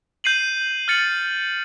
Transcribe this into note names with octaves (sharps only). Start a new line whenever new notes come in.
G6 C7 D#7 F#7
F6 A6 C#7 F#7